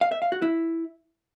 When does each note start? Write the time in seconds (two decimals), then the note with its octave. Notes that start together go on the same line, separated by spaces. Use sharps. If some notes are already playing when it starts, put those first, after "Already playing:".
0.01 F5
0.12 E5
0.22 F5
0.32 F#4
0.42 E4